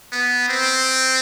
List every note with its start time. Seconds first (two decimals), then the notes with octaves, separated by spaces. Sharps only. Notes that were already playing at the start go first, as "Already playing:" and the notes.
0.12 B3
0.48 C4